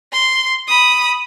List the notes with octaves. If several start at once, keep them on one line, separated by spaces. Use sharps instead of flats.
C6
B5 D#6